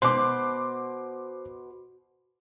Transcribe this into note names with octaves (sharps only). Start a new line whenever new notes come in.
B2 C5 C6 D6